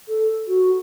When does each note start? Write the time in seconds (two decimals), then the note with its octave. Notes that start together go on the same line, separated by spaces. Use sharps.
0.09 A4
0.48 F#4